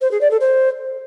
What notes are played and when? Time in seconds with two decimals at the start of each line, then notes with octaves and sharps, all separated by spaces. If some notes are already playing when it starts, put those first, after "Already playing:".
0.01 C5
0.11 G#4
0.21 D5
0.30 A4
0.40 C5